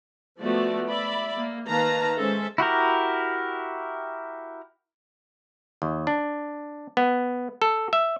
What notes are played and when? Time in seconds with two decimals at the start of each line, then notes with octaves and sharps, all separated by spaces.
0.40 F3 A3 B3 F#4 D5 E5
0.87 D5 E5 B5
1.36 A#3
1.68 D#3 A#3 B4 F5 A5 A#5
2.17 G#3 C#4 A4 C5 E5
2.58 E4 F#4 G4 A#4
5.82 D#2
6.07 D4
6.97 B3
7.62 A4
7.93 E5